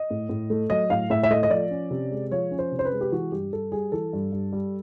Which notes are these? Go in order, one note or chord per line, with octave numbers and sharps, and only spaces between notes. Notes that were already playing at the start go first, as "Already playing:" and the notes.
Already playing: D#5
A2
A2
A3
F#3 D#5
A2 F5
A2 E5
E5
A3 D#5
D#5
F3 D5
C#4
C3
G#3
F3 C#5
C#4
C5
C3
C5
B4
G#3
G4
E3 F#4
G2 G4
G2 A4
G3 G#4
E3 A4
G2
G2
G3